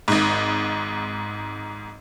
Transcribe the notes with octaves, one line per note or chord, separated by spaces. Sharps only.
G#1 G#2